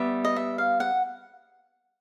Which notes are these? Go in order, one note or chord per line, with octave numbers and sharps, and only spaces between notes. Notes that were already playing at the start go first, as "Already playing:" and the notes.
Already playing: G3 B3 E5
D#5
E5
F5
F#5